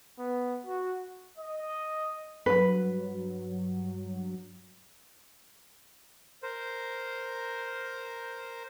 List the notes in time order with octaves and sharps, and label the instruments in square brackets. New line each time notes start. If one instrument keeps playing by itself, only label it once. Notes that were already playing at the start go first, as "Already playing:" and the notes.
[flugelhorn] B3
F#4
[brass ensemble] D#5
[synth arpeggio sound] G2 F#3 [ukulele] B4
[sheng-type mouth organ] A#4 C5